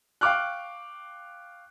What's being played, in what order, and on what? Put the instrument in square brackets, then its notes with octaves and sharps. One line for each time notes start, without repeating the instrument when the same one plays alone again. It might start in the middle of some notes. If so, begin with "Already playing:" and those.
[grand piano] F5 G5 C#6 D6 F6 F#6